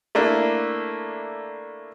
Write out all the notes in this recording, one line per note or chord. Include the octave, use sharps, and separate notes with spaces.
A3 A#3 D4 E4